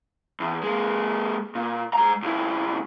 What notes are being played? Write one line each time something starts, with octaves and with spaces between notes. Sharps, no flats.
E2
G#3 A#3
A#2
G#3 A#5
C#2 E4